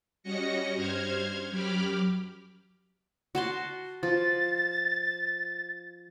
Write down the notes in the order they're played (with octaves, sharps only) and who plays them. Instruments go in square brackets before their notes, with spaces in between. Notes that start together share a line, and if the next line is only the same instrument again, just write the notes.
[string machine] G3 C#4 F#4 D#5 A#6 C#7
G2 C5 F6 G#6
F#2 F#3 G4 B5 D6 F6
[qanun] F#4 A5 C6
[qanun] F3 [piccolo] A6